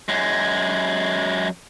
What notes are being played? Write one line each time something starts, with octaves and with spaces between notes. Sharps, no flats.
F#2 G#3